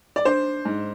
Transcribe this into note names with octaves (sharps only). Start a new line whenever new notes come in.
D5
D4 C5
G#2